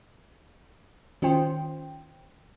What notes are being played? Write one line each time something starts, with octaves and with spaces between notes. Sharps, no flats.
D#3 C#4 F4 C5 G5 C6